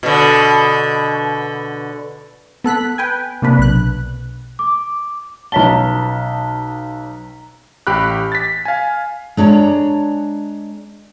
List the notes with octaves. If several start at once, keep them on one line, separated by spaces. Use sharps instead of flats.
B2 D3
B3 A4 F#6 B6
B4 G5 G#5
C3 A#3 D4 B4
B1 F#6
D6
B1 C#4 A5 A#5 B6 G7
A1 G4 B5 F#6
A6 B6
F5 G#5
G#3 D4 C#5 A#5